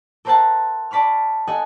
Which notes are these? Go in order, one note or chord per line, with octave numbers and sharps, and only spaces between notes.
A4 A#4 C5 E5 F#5 A5
D5 A5 B5 C#6 F6
A4 D#5 F#5 G#5